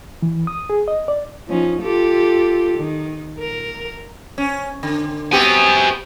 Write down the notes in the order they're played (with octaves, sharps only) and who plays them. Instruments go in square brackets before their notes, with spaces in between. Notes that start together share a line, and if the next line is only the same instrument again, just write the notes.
[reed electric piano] E3
D#6
G#4
D#5
D5
[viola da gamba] F3 C#4 D#4
F4 G4 A4
D#3
A#4
[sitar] C#4
D3
[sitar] B3 C4 G4 [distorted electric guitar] F#4 G#5